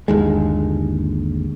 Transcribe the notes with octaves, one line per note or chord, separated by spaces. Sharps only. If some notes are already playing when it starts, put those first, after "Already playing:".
G1 D#2 G#3